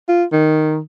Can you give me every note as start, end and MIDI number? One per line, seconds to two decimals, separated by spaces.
0.09 0.24 65
0.32 0.79 51